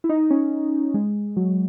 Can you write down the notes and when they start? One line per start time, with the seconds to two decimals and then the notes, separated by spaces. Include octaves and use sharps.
0.04 E4
0.09 D#4
0.30 C#4
0.94 G#3
1.36 F#3